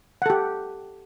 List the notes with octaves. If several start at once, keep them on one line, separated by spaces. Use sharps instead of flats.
G4 A4 F#5